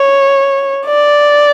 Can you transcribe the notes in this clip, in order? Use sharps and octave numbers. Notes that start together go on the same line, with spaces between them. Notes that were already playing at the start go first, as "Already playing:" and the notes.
Already playing: C#5
D5